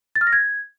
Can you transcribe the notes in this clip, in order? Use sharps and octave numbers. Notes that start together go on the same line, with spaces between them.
A6
F6
A#6
G#6